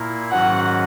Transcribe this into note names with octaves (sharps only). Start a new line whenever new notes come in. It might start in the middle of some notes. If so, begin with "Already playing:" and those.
Already playing: A#2 A#3 E4
G#2 D#3 F#3 C#4 F#4 F#5